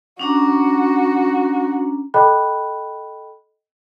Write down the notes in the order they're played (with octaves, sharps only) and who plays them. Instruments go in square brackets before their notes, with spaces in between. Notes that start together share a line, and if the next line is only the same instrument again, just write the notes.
[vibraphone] C#4 D4 A#5 [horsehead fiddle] F#4
[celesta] A4 D#5 G5 B5 F#6